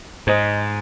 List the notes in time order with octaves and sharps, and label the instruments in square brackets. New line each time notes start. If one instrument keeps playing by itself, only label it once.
[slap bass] G#2 [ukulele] C5 D#5